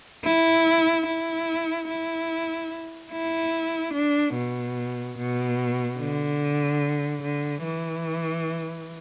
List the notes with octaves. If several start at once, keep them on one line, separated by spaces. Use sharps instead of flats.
E4
E4
E4
E4
D4
B2
B2
D3
D3
E3